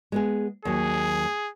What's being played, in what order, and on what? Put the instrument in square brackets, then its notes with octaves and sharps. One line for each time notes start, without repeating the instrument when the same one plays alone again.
[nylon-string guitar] G#3 B3 G#4
[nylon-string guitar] D#2 F#3 [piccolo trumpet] G#4